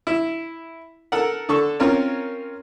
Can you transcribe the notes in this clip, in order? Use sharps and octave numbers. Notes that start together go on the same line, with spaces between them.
E4
A4 A#4 F#5
D3 A4 C#6
C4 C#4 F4 A#4 C#5